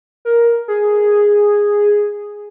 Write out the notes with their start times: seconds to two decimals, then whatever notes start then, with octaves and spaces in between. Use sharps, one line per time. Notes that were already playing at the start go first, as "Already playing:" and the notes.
0.25 A#4
0.68 G#4